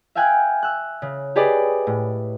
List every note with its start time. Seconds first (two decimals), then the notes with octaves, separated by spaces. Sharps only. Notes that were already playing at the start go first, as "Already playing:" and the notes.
0.15 E5 F5 G5 G#5 F#6 G#6
0.63 E6 F#6
1.02 C#3
1.36 G4 G#4 B4 D5 D#5
1.87 A2